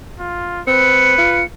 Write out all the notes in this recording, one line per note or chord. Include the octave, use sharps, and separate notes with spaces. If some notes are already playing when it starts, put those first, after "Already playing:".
F4
C4 B4 C#7
F4